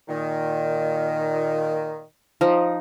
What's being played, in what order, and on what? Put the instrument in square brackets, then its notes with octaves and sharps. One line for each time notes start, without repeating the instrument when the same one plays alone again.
[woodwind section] A#2 D#3
[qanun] F3 D#4